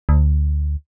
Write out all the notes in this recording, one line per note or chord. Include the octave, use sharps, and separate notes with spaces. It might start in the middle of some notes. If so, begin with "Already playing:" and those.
D2